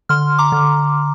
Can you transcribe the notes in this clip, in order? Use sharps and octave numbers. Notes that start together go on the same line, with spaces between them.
D3 C6 F6
A#5 D6
D3